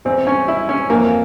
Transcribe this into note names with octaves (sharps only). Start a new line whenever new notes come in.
E2 E3 C4
C#4
E4
C#4
F2 E3 A#3